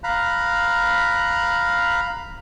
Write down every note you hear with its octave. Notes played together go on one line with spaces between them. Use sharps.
F5 A#5 B5 F#6